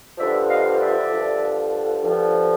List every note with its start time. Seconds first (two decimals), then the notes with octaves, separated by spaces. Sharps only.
0.18 G2 D3 F3 D5 E5
0.48 D#5 F5
0.79 D5 E5
1.10 G2 D3 F3
2.02 G2 D3 F3